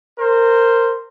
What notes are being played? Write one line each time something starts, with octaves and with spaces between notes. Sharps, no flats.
A#4 C5